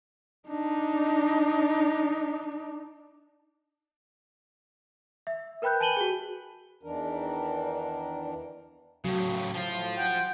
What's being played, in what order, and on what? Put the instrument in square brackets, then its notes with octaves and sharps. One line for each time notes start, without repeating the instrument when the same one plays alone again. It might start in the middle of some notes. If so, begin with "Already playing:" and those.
[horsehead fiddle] D4 D#4
[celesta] E5
A#4 B4 G5 B5 F#6 G6
G#5 A5 B5 D#7 F#7 G7
F#4 G#4
[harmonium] E2 D#3 E3 D4 A#4
[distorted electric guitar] A2 C#3 [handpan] F#3
[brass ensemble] A2 [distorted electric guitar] F3 F4
[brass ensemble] F#5 [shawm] G5